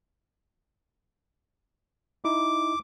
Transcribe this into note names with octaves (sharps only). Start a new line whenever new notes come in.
D#4 E4 D6